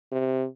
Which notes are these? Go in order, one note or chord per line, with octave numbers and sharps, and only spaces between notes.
C3